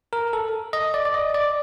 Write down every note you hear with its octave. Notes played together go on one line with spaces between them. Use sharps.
A#4
A4
D#5
D5
D5
D#5
D5